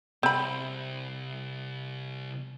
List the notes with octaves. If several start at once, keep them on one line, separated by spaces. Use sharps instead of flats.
C2 C4 B5